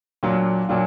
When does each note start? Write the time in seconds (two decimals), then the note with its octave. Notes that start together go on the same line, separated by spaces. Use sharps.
0.23 A#2 F#3 D4 F4
0.69 A#2 F#3 D4 F4